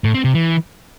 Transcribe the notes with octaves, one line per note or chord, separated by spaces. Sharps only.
A2
C4
C3
E3